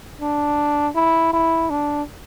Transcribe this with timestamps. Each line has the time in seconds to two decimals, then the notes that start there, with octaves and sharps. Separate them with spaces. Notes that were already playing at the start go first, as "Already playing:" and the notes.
0.22 D4
0.95 E4
1.33 E4
1.70 D4